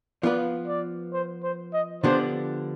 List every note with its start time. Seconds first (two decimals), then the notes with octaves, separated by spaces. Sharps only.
0.23 F3 B3 F4 B4 D5
0.67 D5
1.13 C5
1.43 C5
1.73 D#5
2.04 D3 F3 B3 D4 G4 C5